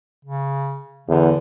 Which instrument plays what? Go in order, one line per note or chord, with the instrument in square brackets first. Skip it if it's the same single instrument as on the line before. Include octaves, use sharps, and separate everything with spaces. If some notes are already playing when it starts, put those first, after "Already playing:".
[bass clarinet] C#3
[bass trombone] E2 [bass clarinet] D3